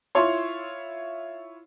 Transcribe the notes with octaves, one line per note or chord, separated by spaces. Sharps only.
E4 F4 C#5 C6